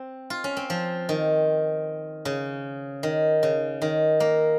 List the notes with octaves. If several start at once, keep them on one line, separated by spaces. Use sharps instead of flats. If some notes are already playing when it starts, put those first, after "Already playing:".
Already playing: C4
F4
C#4
C4
F3
D#3
C#3
D#3
C#3
D#3
A#3